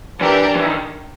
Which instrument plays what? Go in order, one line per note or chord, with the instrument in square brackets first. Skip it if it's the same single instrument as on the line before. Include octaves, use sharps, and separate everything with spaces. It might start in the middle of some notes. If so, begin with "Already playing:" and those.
[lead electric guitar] E3 [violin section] D4 G4 A#4
[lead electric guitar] E3
D#3